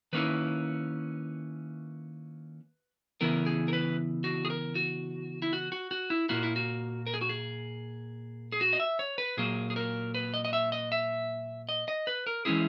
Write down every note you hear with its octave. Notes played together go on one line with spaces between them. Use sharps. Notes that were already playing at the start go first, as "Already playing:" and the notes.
D#3 A#3 C#4 E4 B4
C#3 E3 B3 E4 A#4
G#4
A#4
B4
F#4
G#4
A#4
F#4
E4
F#4
F#4
F#4
E4
A#2 A#3 E4 F#4
E4
F#4
A#4
G#4
F#4
G#4
G#4
F#4
D#5
E5
C#5
B4
A#2 F#3 A#3 G#4
G#4
A#4
B4
D#5
D#5
E5
D#5
E5
D#5
D#5
B4
A#4
E3 G#3 C#4 E4 G#4